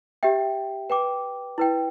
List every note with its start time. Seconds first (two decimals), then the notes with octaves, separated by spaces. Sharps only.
0.23 G4 E5 G5
0.90 B4 G5 D6
1.58 E4 B4 G5